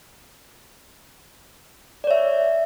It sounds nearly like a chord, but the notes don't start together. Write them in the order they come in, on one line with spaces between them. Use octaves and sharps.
D5 C#5 E5